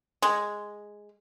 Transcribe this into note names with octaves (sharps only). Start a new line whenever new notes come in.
G#3